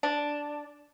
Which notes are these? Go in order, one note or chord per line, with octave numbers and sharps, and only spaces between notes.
D4